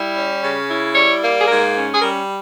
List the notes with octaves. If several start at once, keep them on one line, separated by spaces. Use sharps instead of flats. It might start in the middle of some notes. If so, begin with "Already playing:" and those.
Already playing: G3 E4
C#4
C#3
E4
G3 C#5
A#3
G#4
G#2 A#4
C#4
G#4
G3 A#4